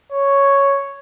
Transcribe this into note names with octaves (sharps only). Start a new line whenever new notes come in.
C#5